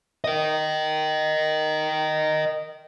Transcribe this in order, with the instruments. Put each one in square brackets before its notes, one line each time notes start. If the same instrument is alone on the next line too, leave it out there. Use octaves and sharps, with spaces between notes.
[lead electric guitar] A#4 D#5